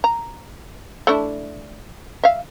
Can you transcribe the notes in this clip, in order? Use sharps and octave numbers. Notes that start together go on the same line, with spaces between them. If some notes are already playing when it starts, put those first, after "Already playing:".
A#5
A3 D4 E4
E5 F5